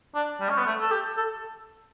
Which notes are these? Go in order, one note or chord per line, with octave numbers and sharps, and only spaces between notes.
D4
G3
C#4
B3
A3
A4
G4
A4